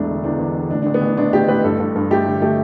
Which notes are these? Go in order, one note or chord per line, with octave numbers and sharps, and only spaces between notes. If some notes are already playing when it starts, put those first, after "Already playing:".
Already playing: E1 A1 A3 D4
D3
E2 D4
E2
D3
A1 D4
A1 D4
B3
A1 D4
A1 D4
A1 G4
A1 B4
G2 A4
G2
G2
A3 G4
D3
A3 G4